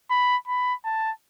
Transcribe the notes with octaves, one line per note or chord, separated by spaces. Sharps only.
B5
B5
A5